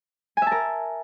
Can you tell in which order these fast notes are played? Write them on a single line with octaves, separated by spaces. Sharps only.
G#5 E5 A5 A#4